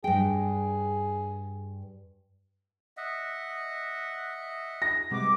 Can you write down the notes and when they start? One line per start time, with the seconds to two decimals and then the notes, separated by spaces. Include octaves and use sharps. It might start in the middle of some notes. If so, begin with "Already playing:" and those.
0.04 G2 G#4 G5
2.97 D#5 E5 F#5
4.82 A#6
5.11 C3 G3 G#3 B3 F#4 D6